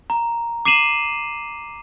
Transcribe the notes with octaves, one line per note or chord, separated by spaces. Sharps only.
A#5
D6 C7 D#7 E7 F#7